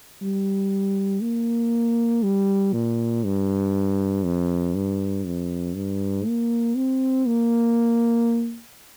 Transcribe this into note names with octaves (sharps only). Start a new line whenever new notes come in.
G3
A#3
G3
A#2
G2
F2
G2
F2
G2
A#3
C4
A#3